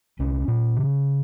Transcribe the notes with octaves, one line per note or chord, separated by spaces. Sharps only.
C2 C#4
A#2
C#3